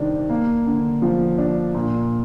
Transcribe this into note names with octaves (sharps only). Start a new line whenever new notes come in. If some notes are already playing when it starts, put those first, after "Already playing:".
Already playing: C3 D#3 G3 D4
A#3
D3
F3
D4
A#2